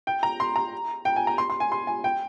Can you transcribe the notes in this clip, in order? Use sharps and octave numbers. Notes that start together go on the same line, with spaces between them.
G5
A#5
C6
A#5
G5
G#5
A#5
C6
C6
G#5
C6
G#5
G5